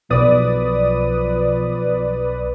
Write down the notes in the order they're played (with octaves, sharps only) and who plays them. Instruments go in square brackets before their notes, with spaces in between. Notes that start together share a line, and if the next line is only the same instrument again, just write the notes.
[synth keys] B1 D5 D#6 [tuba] F3 [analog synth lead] B4